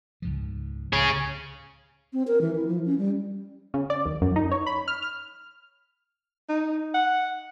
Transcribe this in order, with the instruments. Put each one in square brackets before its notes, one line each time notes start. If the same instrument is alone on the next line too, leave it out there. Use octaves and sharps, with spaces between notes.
[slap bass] C#2 G#2 F3
[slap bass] C#2 A2 [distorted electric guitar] G#4 C#5
[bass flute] C4
A#4
E3
E4
F3
C#4
G3
[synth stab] C#3
D5
D#2
F#2
D#4
C#5
B5
F6
F6
[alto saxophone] D#4
F#5